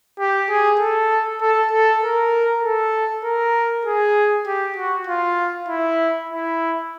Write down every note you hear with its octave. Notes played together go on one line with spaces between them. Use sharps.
G4
G#4
A4
A4
A4
A#4
A4
A#4
G#4
G4
F#4
F4
E4
E4